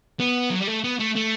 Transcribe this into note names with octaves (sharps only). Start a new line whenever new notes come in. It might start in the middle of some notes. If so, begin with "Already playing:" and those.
B3
F#3
G3
A3
B3
A3
A3